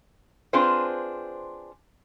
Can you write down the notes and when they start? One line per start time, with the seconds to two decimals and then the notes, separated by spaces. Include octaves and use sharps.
0.53 C4 D4 F4 G#4 B4 C5